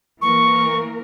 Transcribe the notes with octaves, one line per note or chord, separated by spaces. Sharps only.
E3 A#3 A#4 C#6